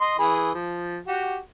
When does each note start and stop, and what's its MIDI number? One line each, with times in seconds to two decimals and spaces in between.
0.01 0.18 75
0.01 0.18 84
0.19 0.51 52
0.19 0.51 68
0.19 0.51 83
0.54 0.99 53
1.08 1.39 66
1.08 1.39 67